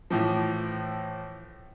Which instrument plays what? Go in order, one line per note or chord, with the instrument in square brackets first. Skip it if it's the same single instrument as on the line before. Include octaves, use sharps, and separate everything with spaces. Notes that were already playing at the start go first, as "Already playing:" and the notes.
[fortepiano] A2 E3 F3